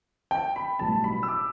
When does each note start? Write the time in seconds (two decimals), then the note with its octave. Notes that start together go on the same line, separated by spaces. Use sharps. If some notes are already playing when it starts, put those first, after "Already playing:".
0.31 G5
0.56 B5
0.79 B1 A2 G3 B3 A5
1.04 B5
1.23 E6
1.28 D6